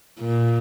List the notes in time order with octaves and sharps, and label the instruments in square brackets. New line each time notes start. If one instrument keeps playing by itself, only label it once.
[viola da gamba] A#2